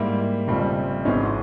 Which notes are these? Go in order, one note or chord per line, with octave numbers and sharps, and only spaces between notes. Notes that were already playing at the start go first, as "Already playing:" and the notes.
Already playing: G#2 G3 A#3 E4
F1 F2 C#3 G3 C4
G#1 G#2 E3 G#3 C#4